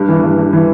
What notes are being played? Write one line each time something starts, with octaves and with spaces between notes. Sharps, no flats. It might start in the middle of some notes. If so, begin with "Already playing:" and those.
Already playing: G2
E3
G2
G2
E3